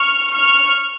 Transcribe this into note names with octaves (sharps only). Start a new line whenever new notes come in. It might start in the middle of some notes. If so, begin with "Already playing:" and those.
Already playing: C#6 F6
C#6 F6